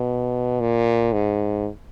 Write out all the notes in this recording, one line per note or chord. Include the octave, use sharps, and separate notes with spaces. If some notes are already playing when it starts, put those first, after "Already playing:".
Already playing: B2
A#2
G#2